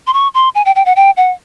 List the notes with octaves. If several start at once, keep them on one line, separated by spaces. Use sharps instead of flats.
C6
C#6
C6
G#5
G5
G5
F#5
G5
F#5